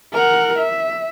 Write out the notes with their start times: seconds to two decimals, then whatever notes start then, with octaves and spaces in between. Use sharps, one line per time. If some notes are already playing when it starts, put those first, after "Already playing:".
0.13 A#4 F#5
0.59 E5